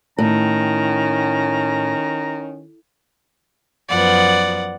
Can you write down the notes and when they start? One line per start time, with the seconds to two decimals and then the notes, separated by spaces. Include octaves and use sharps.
0.18 A2 D#3 C#4 A#5
3.89 F#2 F3 B3 D5 F#5